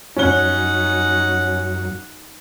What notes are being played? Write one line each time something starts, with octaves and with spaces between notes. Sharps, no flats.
F#2 C#4 D#4 F#5 G7